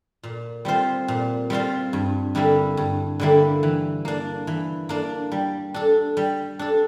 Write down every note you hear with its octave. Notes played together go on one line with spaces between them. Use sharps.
A#2
G3 C4 F4 C5
A#2
G3 C4 F4 C5
G2
D3 G3 A#3 E4
G2
D3 G3 A#3 E4
E3
A#3 D4
E3
A#3 D4
G3
D4 A4
G3
D4 A4